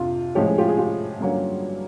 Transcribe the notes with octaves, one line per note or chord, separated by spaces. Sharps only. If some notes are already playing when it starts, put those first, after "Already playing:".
Already playing: F2 C3 D4 F4
A2 F3 G#3 C#4 G4
G#4
F4 G4
G#4
F4 G4
G2 D3 F#3 A#3 C#4